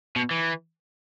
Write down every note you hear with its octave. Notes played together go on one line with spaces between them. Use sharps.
B2
E3